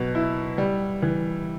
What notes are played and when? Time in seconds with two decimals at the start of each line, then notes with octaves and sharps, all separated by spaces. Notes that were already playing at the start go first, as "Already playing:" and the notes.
Already playing: B2 F#3
0.15 E4
0.58 G3
1.02 E3